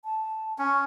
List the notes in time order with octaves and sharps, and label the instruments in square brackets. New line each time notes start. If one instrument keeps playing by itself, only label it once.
[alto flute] A5
[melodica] C#4 [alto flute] C#6